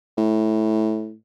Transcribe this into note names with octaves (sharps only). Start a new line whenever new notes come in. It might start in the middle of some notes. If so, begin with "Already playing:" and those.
A2